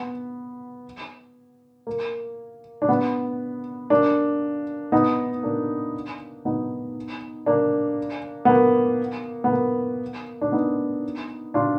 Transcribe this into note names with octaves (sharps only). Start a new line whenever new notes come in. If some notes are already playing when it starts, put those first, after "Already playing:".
Already playing: B3
A#3
D4
B3
A#3 D4
B3 D#4
A#3 D4
B3 D#4
A#3 D4
B3
A#3
B3
A#3
D4
B3 D#4
D4 F4